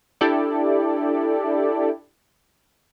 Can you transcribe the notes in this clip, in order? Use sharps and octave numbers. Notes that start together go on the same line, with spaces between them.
D4 E4 G4 A4 D5